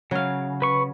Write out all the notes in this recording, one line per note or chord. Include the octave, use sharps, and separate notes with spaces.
C#3 F#3 F5
B4 C#6